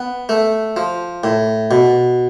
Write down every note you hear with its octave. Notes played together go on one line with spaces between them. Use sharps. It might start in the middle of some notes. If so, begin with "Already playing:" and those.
Already playing: B3
A3
F3
A2
B2